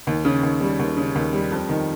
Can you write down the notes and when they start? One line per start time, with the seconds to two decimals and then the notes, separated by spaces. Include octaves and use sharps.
0.07 D#2
0.25 C#3
0.43 D#2
0.61 G3
0.79 D#2
0.97 C#3
1.15 D#2
1.33 G3
1.51 F2
1.69 D#3